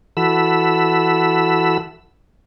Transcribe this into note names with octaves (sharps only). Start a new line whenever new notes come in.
E3 F#4 A4 B5 E6